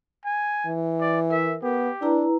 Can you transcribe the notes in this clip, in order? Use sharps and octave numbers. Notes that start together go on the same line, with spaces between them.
G#5
E3
D5
A#4 E5
B3 G4
D4 E4 B4 A#5